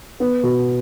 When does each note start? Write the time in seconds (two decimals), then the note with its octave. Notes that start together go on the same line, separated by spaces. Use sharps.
0.20 B3
0.43 B2